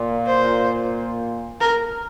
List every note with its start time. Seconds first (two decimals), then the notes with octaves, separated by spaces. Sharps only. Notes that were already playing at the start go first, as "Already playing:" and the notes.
Already playing: A#2
0.26 C5
1.61 A#4